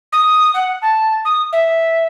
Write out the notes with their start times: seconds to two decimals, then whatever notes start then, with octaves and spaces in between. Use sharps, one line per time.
0.12 D#6
0.54 F#5
0.81 A5
1.24 D#6
1.52 E5